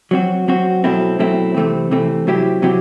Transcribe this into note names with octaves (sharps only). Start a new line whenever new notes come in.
F#3 C4 F#4
F#3 C4 F#4
B2 F#3 A3 C4 E4
B2 F#3 A3 C4 E4
C3 E3 A3 C4
C3 E3 A3 C4
C3 F#3 C4 E4 G4
C3 F#3 C4 E4 G4